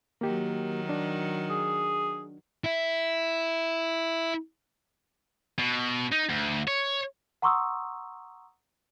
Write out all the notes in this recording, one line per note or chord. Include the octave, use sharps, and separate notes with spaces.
D#3 F#3 A#3 G4
D4
G#4
E4 E5
B2
D#4
D2
C#5
F#5 A#5 C6 C#6 D#6 E6